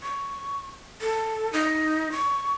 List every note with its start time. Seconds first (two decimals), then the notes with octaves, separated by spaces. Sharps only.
0.03 C#6
1.02 A4
1.53 D#4
2.12 C#6